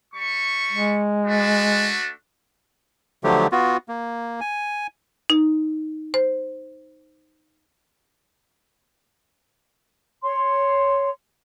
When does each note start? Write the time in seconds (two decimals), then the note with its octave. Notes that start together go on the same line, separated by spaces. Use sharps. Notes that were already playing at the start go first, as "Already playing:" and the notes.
0.14 G3 C#6
0.72 G#3
1.26 A3 D4 F#4
3.24 D3 F3 F#3 A3 G4
3.52 B3 F4 F#4
3.89 A#3
4.41 G#5
5.30 D#4
6.14 C5
10.21 C#5 C6